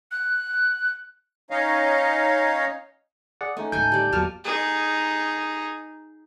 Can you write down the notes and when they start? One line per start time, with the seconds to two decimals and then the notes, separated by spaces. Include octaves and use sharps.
0.12 F#6
1.51 C#4 D#4 C#5 D#5 F5
3.41 G#4 D5 F#5
3.57 A3 C#4 D#4
3.72 D2 A2 A4 G#5 G6
3.92 G3 D5
4.13 E2 B2 F#3 A#3 A5 F6
4.44 D#4 G#4